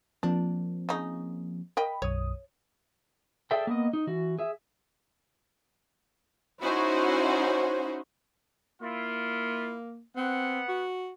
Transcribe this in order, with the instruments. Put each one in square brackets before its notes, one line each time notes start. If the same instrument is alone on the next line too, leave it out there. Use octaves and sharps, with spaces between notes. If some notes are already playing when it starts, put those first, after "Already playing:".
[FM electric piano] F3 A#3 C4 [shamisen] D4
[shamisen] C#3 D#4
[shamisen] A#4 D#5 G5 [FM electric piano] B5
[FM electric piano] B1 F#2 D#6 [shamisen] C#5
[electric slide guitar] G#4 A4 C5 D5 E5 G5
A#3 B3 D#5
D#4
E3 F#4
G#4 E5
[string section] C#4 D#4 E4 F#4 C5
[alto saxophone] A#3 [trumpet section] E4 F4
[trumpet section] B3 F#5 [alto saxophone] C4
[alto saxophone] F#4